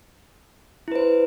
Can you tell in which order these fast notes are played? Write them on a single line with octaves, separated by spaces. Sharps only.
E4 B4 C5